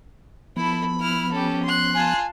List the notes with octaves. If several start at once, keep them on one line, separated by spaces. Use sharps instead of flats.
F3 B3 E4 A4 B5
E4 F6
C#4 G4 A4
C6 F#6
F4 G#5 A5